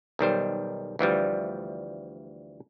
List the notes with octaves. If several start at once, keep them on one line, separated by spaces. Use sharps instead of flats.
B1 D#3 G3 C5
D2 E3 F3 G3